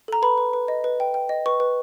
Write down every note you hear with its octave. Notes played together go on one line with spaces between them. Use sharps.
A4 A#5
B4 B5
B4
B4
D#5
B4
G5
G5
D#5
B4 C#6
B4